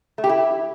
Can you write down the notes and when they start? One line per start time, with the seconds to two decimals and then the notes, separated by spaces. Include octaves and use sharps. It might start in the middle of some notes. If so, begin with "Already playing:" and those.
0.18 A3
0.24 G4
0.29 E4